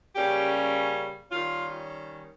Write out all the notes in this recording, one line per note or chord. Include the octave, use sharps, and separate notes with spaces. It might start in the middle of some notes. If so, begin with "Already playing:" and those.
C#3 G3 A#3 C#4 G4
D#3 G3 C#4 F4